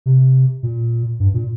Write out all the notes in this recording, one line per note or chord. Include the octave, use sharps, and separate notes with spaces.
C3
A#2
G2
A#2